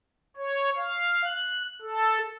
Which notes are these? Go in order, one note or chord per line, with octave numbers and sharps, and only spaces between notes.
C#5
F5
F#6
A4